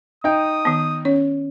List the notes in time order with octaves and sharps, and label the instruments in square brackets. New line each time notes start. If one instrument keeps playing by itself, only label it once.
[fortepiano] D#4 G5 [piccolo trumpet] D#6
[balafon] D#3 B3
[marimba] C#4 [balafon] C#5